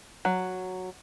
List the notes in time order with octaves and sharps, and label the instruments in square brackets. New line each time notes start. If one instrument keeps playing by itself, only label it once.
[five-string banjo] F#3